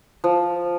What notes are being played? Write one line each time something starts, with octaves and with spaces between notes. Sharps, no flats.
F3